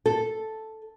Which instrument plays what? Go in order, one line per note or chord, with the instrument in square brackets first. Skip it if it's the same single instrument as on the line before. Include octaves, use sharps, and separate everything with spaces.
[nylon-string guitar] A4